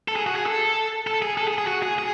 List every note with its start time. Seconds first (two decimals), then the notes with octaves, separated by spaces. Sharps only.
0.08 A4
0.16 G#4
0.26 F#4
0.36 G#4
0.46 A4
1.07 A4
1.22 G#4
1.37 A4
1.47 G#4
1.58 G#4
1.67 F#4
1.83 G#4
1.99 G#4